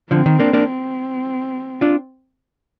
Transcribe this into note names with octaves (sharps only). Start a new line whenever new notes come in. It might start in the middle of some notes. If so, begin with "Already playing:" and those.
D3 F3 C4
D#3
A#3 D4
A#3 D4
C4
D4 F4